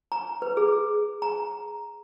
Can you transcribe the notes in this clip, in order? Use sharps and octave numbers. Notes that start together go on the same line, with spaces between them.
A#5
B4
G#4
A#5